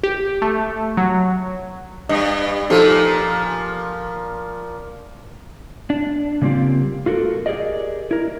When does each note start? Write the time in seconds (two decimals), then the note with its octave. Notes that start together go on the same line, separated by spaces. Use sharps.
0.03 G4
0.42 A3
0.97 F#3
2.09 G2 D#5
2.70 A#2 F3 D#4 G4 A4
5.90 D4
6.41 C#3 G3 A#3 C4 F4 G4
7.06 F4 F#4 A4 A#4
7.46 G4 G#4 A#4 D5 D#5
8.11 E4 A#4